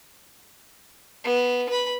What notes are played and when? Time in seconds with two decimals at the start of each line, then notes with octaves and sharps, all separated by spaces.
1.24 B3
1.69 B4 B5